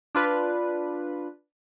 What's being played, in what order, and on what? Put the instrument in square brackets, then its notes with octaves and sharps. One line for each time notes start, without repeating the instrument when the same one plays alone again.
[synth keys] D4 F4 B4